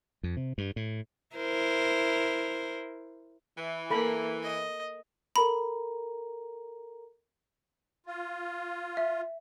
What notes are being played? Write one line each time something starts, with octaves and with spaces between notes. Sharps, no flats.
F2
C3
G2
A2
E4 A#4 C5
E3
A#3 A4 B5
D#5
A4 A#4 A#5 B5
F4
E5